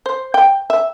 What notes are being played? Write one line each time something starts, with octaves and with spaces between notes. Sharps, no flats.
C5
G5
E5